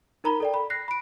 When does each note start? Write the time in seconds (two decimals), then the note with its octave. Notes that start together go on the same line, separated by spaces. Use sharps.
0.24 D#4 A#4 A#5 B5 G7
0.40 A4 D5 G5
0.54 B5
0.70 F#6 A#6 C7
0.88 B5 D7